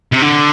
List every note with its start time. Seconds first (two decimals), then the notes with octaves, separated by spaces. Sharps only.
0.12 C3
0.22 D3